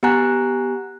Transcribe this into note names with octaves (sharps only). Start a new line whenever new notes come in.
B3 G4 F#5 G#5 A#5 F#6